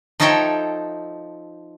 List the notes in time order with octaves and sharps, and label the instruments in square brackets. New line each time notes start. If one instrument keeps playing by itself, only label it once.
[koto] F3 D#4 A4 C#5 E5 G5